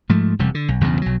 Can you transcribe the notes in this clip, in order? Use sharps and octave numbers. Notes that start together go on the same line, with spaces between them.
G#2 F3 A3
E1 C3 G3
D3
B1
B1 E2 G2 C#3
B1 F#3